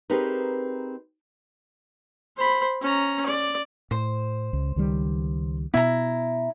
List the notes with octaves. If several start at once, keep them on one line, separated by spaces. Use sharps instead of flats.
C4 D#4 G4 G#4 A#4 B4
C5 B5
C#4 A#5
D5
A2 C5
C#2
C#2 D#3 G3
B2 B3 E4 A#5